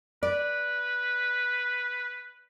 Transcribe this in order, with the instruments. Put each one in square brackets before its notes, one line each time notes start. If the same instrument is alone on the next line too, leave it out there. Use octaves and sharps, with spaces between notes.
[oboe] B4 [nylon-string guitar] D5